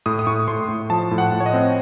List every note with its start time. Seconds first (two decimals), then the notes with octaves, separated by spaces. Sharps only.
0.06 A2 D#6
0.19 D#6
0.27 A2 C#6
0.48 A2 C6
0.69 A2
0.90 F3 A5
1.11 A2
1.18 F#5
1.32 A2
1.40 C#5
1.46 D#5
1.53 C4